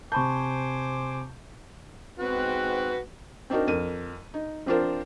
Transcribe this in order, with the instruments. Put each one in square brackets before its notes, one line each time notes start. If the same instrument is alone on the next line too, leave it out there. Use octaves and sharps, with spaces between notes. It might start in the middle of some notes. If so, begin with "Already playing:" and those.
[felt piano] C3 G6 [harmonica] C5 G#5 D6 [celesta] A5 B5 C#6
[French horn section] G#2 B3 C4 [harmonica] F#4 B4
[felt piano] C4 D4 D#4 F#4 A#4
F2 A#4 D#7
D#4
F3 C4 D4 F4 A#4 C5